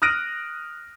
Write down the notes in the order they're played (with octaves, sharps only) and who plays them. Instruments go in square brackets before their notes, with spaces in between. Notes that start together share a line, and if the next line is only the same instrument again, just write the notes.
[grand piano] D#6 F6 F#6 A#6 D7 D#7